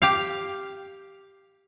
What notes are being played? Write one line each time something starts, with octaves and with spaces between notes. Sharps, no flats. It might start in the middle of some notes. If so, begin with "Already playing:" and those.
G4 F5